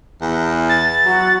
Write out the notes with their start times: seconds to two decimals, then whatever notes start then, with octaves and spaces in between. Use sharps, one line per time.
0.21 E2
0.69 A6
1.06 F#3 F#4